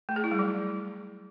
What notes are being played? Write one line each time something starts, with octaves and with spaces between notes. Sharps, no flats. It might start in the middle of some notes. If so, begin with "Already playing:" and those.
A3
G#4
E4
G3
F#3